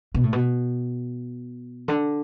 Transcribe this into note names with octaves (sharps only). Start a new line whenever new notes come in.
B2
A2
B2
D3